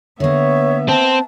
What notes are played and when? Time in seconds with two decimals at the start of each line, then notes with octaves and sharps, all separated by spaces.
0.20 D3 A#3 B3 C#5 E5
0.89 C4 A5